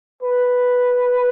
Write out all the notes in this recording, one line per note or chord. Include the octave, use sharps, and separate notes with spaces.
B4